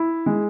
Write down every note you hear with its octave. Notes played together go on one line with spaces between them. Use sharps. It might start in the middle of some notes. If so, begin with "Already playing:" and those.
Already playing: E4
G#3